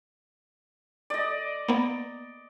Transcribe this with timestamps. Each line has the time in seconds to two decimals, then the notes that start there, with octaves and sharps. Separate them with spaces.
1.10 D5 D#5
1.68 A#3 B3